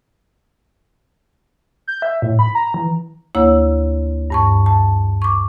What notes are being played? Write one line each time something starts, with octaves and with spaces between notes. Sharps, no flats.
G6
E5
A2
B5
A#5
E3
D2 A#3 E4 C#5 E6
G2 A5 C#6
A5
C#6 D6